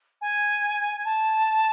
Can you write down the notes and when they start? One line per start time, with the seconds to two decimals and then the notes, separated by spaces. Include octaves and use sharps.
0.21 G#5
1.05 A5